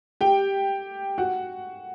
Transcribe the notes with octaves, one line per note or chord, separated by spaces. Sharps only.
G4 G5
F#4 F#5